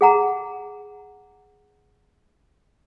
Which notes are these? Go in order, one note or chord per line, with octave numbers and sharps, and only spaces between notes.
G#4 F#5 A#5